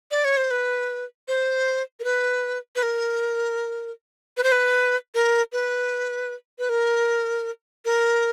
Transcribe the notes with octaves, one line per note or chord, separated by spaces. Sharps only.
D5
C#5
C5
B4
C5
A#4
B4
B4
A#4
B4
C5
B4
A#4
B4
B4
A#4
A#4